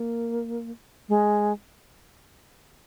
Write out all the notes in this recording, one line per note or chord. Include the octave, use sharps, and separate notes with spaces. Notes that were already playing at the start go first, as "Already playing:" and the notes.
Already playing: A#3
G#3